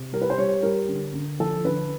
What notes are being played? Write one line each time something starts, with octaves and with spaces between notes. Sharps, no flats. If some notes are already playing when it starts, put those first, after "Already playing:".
Already playing: C3
G3 A#4
B4
C5
G3 C#5
G3 A#4
D3
D3
F3 A4
D3 B4